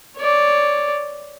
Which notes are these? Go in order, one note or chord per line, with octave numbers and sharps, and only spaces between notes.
C#5 D5